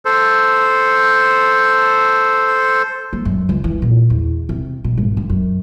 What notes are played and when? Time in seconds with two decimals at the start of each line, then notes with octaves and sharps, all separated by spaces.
0.05 A4 C5
3.13 A#3
3.25 F#2
3.49 C#2
3.64 E3
3.82 A#2
4.10 E2
4.49 C3
4.84 B2
4.97 G#1
5.17 D3
5.30 F#2